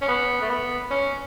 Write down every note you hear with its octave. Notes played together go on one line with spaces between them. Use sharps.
C#4
B3
A3
B3
C#4